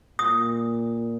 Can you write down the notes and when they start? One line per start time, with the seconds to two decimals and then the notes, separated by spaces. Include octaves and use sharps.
0.19 A#2 D#6